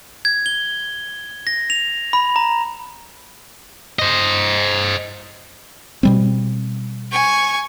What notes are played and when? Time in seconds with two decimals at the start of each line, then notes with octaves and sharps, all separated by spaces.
0.25 G#6
0.46 G7
1.47 A#6
1.70 F7
2.13 B5
2.36 A#5
3.99 C5 D#5
6.03 B2 G3 C4
7.12 G#5 C#6